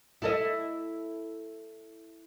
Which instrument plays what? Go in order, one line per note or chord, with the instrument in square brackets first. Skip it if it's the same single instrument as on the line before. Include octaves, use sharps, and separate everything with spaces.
[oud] E4 A4 D#5